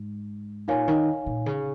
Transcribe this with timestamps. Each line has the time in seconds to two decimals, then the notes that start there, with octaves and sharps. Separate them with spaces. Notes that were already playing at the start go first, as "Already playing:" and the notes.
Already playing: G#2
0.68 A#2 D#4 C#5 F5 G#5
0.88 D#3
1.26 A#2
1.46 C#3